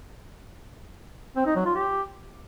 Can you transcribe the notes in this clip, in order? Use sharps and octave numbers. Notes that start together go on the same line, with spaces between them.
C4
D#4
F#3
F4
G4